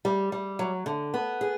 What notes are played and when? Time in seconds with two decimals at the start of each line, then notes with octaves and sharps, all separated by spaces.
0.05 G3
0.32 G3
0.59 F#3
0.86 D3
1.14 B3
1.41 G#4